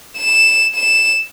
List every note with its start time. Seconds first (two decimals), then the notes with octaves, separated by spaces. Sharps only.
0.17 E7
0.75 E7